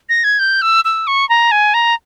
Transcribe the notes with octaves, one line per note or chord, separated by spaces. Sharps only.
A#6
G#6
G6
E6
E6
C#6
A#5
G#5
A#5